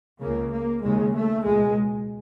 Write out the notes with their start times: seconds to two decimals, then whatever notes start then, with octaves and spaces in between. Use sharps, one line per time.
0.21 C#2 C#3 A#3
0.51 A#3
0.83 D#2 C#3 G#3
1.14 A3
1.44 C#2 B2 G#3